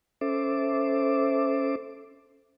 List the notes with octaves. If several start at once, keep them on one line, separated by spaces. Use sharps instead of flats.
C#4 A4 C5 E5 D6